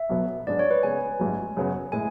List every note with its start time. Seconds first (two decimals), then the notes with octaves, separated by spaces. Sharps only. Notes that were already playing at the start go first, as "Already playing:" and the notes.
Already playing: E5
0.10 B1 B2 F#3 B3
0.47 G#2 F#3 B3 D4 G#4 D5
0.59 C#5
0.71 B4
0.83 C#3 G#3 B3 G#5
1.19 A1 G#2 F#3
1.57 F#2 C#3 F#3 B3
1.92 A2 G#3 G#5